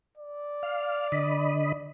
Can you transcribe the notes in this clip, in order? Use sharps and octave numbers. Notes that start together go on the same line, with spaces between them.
D5
F5
D3 D#5 B5